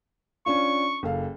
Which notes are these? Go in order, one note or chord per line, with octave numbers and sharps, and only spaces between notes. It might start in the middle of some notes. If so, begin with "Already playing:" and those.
C#4 D4 F4 C#6
F#1 A4 F5